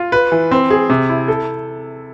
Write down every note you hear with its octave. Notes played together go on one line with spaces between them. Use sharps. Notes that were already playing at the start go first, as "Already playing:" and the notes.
Already playing: F4
B4
E3
C4
G#4
C3
E4
A4